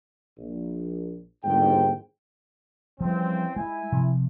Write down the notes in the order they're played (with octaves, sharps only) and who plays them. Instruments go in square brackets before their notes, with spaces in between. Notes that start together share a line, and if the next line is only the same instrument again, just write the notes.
[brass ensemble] A#1
G1 D#2 G#2 G5
[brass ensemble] C#3 E3 C4 [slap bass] F3 G3
[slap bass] G#3 [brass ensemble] E4 G#5
[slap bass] C3 F3